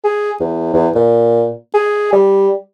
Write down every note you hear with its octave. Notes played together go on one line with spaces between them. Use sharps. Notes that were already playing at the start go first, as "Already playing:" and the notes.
G#4
E2
E2
A#2
G#4
G3